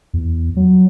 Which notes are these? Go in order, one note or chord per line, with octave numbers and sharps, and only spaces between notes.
E2
F#3